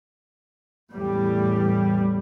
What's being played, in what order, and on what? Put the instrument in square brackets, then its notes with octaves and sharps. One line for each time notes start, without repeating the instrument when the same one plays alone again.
[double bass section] E2 A2 G3